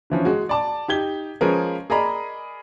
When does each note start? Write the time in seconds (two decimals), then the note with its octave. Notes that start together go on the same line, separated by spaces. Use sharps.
0.10 D3 E3 F3 C#4
0.25 G#3 F#4
0.49 D5 A5 D6
0.88 D#4 G4 G#6 G7
1.41 F3 G#3 C#4 G#4 A#4 B4
1.90 G#4 A#4 D5 D#5 A#5 B5